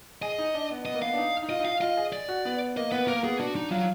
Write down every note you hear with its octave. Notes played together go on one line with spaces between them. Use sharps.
G#4 D#5
D#4
D4
B3
B3 D#5
A#3
B3 F5
D4
D#4
D#4
F4 D#5
D#4
F4 F5
F4 D#5
G#4
D5
F#4
B3
A#3 D#5
B3 B4
A#3 A#4
B3 G#4
D4 F#4
D#4
F#3 F4